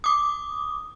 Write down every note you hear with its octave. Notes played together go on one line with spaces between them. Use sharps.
D6 D#6